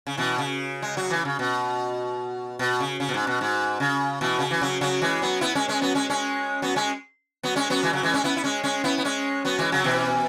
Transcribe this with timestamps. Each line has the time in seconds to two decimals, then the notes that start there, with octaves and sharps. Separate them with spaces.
0.07 C#3
0.17 B2 E3
0.38 C#3
0.82 G#3
0.97 F#3
1.10 E3
1.25 C#3
1.39 B2
2.59 B2
2.80 C#3
3.00 C#3
3.09 B2
3.14 G#2
3.27 B2
3.41 G#2
3.80 C#3
4.21 B2 E3
4.39 C#3
4.51 E3
4.61 C#3 F#3
4.81 C#3 F#3
5.02 E3 G#3
5.22 F#3 B3
5.41 B3 E4
5.55 G#3 C#4
5.68 G#3 C#4
5.82 F#3 B3
5.95 G#3 C#4
6.09 G#3 C#4
6.62 F#3 B3
6.76 G#3 C#4
7.43 F#3 B3
7.56 G#3 C#4
7.70 F#3 B3
7.83 E3 G#3
7.93 C#3 F#3
8.03 E3 G#3
8.13 G#3 C#4
8.24 B3 E4
8.37 E4
8.44 G#3 C#4
8.64 G#3 C#4
8.84 B3 E4
8.98 B3
9.05 G#3 C#4
9.45 F#3 B3
9.59 E3 G#3
9.72 C#3 F#3
9.84 B2 E3